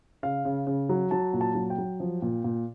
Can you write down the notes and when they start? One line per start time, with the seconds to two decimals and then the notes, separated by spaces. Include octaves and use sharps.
0.23 C#3 F5
0.45 C#3
0.67 C#3
0.89 F#3
1.11 F#3 A5
1.33 A#2
1.41 A5
1.55 F#3
1.70 G5
1.78 F#3
2.00 F3
2.22 A#2
2.44 A#2